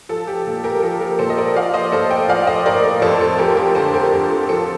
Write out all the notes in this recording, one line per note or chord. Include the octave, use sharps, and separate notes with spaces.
F3 A4
G4
A#2 A4
G4 A#4
F3 A4
G4 A#4
A#2 A4 C5
D#5
A#4 D5
F3 D5 F5
C5 D#5
A2 A4 C5
D#5 G5
F3 D5 F5
C5 D#5
A2 A#4 D5
A#4 D5
F2 A4 C5
A4
F3 G4 A#4
G4 A#4
D3 A4 C5
G4 A#4
F2 G4
A4
F3 A4 C5